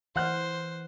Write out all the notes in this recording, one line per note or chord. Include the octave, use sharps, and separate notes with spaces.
E3 C5 F#5 F6 F#6